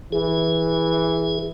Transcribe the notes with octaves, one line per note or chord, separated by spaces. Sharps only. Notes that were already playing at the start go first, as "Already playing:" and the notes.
E3 G#4